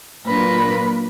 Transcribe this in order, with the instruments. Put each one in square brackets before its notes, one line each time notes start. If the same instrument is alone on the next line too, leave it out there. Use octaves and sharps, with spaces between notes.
[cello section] A#2 F#3 D4 F4 A#4 [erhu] B4